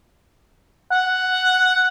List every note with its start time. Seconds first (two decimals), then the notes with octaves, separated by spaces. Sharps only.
0.92 F#5